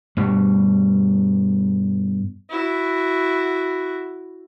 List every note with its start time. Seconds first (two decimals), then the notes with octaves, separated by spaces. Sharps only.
0.17 G2 B2 G3
2.50 E4 F#4